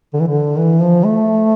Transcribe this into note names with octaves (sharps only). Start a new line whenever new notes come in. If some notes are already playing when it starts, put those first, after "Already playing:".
D3
E3
D3
E3
F3
A3